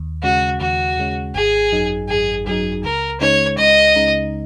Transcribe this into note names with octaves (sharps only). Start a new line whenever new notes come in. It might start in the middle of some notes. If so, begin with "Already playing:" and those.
Already playing: D#2
C#3 G#3 C#4 F#4
D#2 F#4
C#3 G#3 C#4
G#1 G#4
F#2 F#3 D#4
G#1 G#4
F#2 F#3 D#4 G#4
C#2 A#4
C#3 G#3 D#4 C#5
C#2 D#5
C#3 G#3 D#4